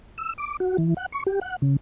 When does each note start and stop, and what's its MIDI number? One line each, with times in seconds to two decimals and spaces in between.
0.18 0.33 88
0.38 0.57 86
0.60 0.77 66
0.78 0.94 52
0.97 1.06 78
1.12 1.23 85
1.27 1.39 67
1.41 1.56 78
1.62 1.76 49